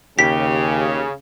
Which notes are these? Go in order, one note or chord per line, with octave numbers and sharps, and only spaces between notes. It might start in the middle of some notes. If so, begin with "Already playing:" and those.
D#2 C#3 G4 B6